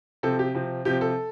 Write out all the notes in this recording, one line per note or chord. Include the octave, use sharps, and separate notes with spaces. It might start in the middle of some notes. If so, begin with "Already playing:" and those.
C3 F3 C4 A4
G4
C3 F3 C4
C3 F3 C4 G4
A4